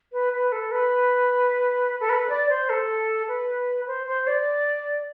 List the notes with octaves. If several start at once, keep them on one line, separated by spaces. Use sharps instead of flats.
B4
B4
A4
B4
A4
B4
D5
C5
A4
B4
C5
C5
D5